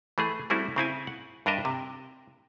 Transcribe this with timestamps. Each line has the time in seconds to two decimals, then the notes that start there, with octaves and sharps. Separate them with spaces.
0.18 E3 A3 G#4
0.50 G3 A3 C4 C#4 E4 F#4
0.76 C#3 C4 E4 G#5
1.07 F#5
1.46 G2 D4 A#4 D#5 E5
1.65 C3